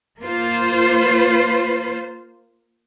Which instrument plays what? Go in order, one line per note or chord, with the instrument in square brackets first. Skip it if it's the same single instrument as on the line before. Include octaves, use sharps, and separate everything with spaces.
[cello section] A#3 F4 C5